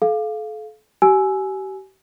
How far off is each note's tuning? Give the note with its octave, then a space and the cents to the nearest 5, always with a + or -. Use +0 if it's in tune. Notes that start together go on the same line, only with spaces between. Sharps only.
A4 -35 F5 +0
G4 -35 G#5 +15 E6 +0